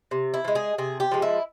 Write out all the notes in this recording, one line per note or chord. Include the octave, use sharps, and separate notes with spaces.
C3
E4
F3
G#3
G#4
C3 G#4
G4
F3 G#3
E4